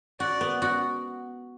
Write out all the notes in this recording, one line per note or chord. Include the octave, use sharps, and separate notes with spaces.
F#4 D5
B3
F#4